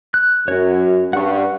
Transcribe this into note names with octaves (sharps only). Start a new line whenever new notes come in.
F#6
F#2 F#4 C#5
G2 F#5 C#6